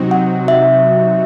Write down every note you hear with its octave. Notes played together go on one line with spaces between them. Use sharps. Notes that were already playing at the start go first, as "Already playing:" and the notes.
Already playing: C3 F#3 C4 D#4 F#4
F#5
E5